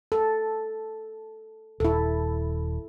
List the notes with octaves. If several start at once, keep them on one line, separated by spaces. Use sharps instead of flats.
A4
D#1 E4 A4